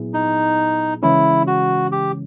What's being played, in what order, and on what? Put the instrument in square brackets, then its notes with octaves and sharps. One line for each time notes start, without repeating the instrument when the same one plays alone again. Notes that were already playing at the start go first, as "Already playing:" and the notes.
Already playing: [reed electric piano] A#2 F#3 B3 E4 G#4
[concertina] D#4
[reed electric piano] C#3 E3 G#3 C#4 [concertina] E4
[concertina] F#4
G4